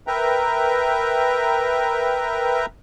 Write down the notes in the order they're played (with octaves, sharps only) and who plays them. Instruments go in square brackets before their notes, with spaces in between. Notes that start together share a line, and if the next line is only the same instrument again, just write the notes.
[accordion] A#4 B4 E5 G5 A#5